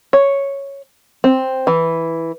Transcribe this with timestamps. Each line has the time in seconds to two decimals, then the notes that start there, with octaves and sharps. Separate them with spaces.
0.13 C#5
1.24 C4
1.67 E3